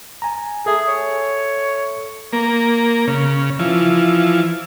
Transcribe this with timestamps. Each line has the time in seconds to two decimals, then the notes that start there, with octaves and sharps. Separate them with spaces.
0.22 G#5 A#5
0.66 G#4 A4 E5
0.88 C#5
2.33 A#3
3.07 C#3
3.59 E3 F3